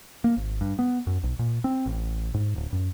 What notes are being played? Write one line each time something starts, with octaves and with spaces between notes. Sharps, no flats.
A#3
G#1
G2
B3
F#2
B1
A#2
C4
A1
G#2
D1
F#2